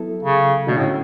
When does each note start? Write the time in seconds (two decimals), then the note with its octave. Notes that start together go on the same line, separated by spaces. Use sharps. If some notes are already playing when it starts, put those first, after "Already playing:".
Already playing: F#3 B3 E4 A4
0.23 C#3
0.67 B2 D3 A3 C#4
0.77 A2